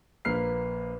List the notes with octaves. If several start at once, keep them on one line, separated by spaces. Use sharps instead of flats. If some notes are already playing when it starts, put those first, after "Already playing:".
A#1 A#3 B4 F6 C7